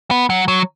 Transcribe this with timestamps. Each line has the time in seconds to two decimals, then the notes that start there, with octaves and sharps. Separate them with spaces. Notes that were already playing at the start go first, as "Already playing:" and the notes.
0.11 B3
0.30 F#3
0.48 F#3